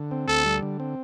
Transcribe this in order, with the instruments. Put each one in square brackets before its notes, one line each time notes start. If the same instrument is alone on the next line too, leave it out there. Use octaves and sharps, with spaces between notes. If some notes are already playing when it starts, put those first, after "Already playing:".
Already playing: [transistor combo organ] D3
C4
[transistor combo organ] D2 [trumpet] A4
[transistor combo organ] G3
D3
C4